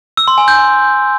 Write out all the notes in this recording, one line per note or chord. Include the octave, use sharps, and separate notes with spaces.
E6
C6
G#5
G6